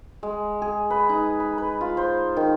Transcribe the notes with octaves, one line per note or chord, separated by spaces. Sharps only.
G#3
G#4
B4
D#4
B5
B4
F4
C5
D#3